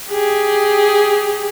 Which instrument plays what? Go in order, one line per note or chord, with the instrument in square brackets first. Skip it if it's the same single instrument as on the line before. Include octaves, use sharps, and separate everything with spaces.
[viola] G4 G#4